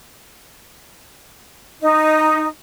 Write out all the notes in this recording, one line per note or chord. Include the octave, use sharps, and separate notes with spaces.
D#4